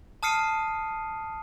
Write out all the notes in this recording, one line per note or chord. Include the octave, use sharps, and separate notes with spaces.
A5 D#6 F6 C7 C#7 D#7